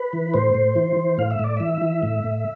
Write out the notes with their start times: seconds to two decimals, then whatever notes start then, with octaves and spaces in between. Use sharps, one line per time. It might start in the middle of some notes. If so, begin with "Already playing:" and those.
Already playing: B4
0.13 E3
0.34 A2 C5
0.54 A2
0.76 E3
0.97 E3
1.18 A2 F5
1.31 E5
1.39 A2 D5
1.57 E3 E5
1.82 E3
2.03 A2
2.24 A2